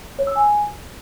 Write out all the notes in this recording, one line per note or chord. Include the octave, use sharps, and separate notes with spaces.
C#5
E6
G#5